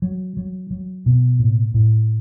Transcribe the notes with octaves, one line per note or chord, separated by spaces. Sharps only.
F#3
F#3
F#3
B2
A2
A2